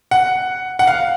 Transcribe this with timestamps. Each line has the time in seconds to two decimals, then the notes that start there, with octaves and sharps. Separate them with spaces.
0.11 F#5
0.79 F#5
0.87 F5